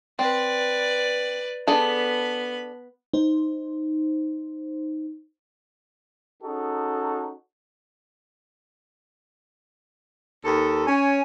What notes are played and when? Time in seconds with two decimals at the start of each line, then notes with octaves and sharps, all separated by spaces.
0.19 C4 B4 D5
1.67 B3 D4 G#4 A4 B5
3.13 D#4 C5
6.43 C#4 D#4 F#4 G#4 A4
10.44 D#2 A4
10.87 C#4 G#5